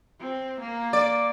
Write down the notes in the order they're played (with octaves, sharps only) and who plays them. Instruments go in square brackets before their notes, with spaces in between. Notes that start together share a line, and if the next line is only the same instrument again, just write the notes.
[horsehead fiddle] C4
A#3
[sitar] D5 [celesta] D6